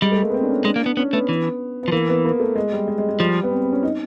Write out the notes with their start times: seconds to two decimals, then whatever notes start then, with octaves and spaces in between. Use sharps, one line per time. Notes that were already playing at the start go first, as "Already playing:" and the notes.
0.02 G3 G#3
0.12 A3
0.22 A#3
0.30 B3
0.34 C4
0.43 D4
0.49 C#4
0.65 G#3 D4
0.76 A#3
0.82 B3 D4
0.97 B3 C#4
1.13 A3 B3
1.29 E3
1.83 B3
1.88 F3
1.92 E3 A#3
2.09 B3
2.25 A#3
2.40 A3
2.55 G#3
2.73 G3
2.88 G#3
2.98 G#3
3.08 G#3
3.19 F3 G3
3.43 B3
3.51 C4
3.62 C4
3.72 C#4
3.83 D#4